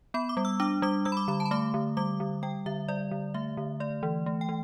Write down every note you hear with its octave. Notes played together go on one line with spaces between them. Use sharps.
B3 B5
D6
G3
E6
D4 D6
G3 D6
G3 E6
B5
D6
D3 B5
A5
B5
A3 D6
D3
G3 D6
D3
G3 G5
D3 E5
G3 D5
D3
A3 E5
D3
A3 D5
E3
A3
G5
E3